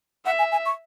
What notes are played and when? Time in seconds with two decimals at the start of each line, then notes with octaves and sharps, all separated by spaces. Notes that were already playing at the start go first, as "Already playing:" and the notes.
0.25 E5 F#5
0.39 G#5
0.52 G#5
0.66 C#6